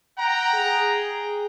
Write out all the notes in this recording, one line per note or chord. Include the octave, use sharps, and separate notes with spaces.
F#5 G5 A#5
G#4